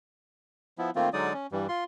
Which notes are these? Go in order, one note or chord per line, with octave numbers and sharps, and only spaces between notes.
F3 B3 E4
D#3 A3 A#3 C4 F4
D3 F#3 G#3 D#4 D5 D#6
C#4
G2 E3 G3
F4 C6